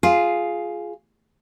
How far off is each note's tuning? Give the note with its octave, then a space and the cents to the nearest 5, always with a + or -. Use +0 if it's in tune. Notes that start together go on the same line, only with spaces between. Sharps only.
F4 +0 G#4 +10